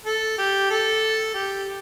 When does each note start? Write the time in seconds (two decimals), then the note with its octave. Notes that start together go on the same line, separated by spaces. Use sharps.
0.05 A4
0.38 G4
0.70 A4
1.34 G4